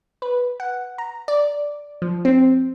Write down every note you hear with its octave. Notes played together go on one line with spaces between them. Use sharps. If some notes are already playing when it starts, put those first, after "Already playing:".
B4
F#5
A#5
D5
F3
C4